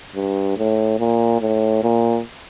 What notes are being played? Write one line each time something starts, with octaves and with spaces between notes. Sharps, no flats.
G2
A2
A#2
A2
A#2